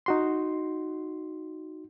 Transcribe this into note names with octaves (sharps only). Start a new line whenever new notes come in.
D#4 F#4 C6